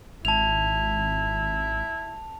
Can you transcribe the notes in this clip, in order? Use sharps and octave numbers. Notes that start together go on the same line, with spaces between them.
G#1 E4 A5 F7